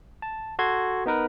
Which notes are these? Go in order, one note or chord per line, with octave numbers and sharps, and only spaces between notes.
A5
F#4 A4 C6 G#6
B3 D#4 A#4 B4